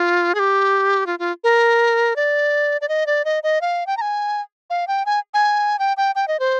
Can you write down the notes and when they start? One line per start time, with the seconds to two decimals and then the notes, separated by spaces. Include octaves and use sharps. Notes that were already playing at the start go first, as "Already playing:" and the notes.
Already playing: F4
0.35 G#4
0.39 G4
1.06 F4
1.19 F4
1.44 A#4
2.16 D5
2.81 D5
2.89 D#5
3.07 D5
3.25 D#5
3.43 D#5
3.61 F5
3.87 G5
3.97 A#5
4.01 G#5
4.70 F5
4.88 G5
5.06 G#5
5.34 G#5
5.79 G5
5.97 G5
6.15 G5
6.28 D#5
6.40 C5